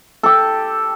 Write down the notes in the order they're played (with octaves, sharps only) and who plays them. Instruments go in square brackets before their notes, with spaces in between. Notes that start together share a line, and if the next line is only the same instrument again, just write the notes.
[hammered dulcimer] G4 A4